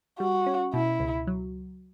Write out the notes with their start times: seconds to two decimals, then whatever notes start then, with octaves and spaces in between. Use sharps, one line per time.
0.19 G3 F#4
0.46 C#4
0.73 B2 E4
1.00 C#2
1.27 F#3